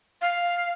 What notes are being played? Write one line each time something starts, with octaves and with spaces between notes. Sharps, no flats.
F5